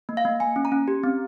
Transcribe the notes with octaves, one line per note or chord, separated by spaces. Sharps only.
A#3
F5
A#3
A#3 G#5
C#4
A#5
C#4
G4
C4